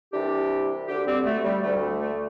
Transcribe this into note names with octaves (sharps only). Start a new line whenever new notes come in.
C2 C3 E3 D4 G4
D2 D3 D4 G4
G3 C4
A3
G3
D2 D3 A3
A3